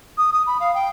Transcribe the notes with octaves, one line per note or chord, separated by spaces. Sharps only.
D#6
D#6
B5
F5
G5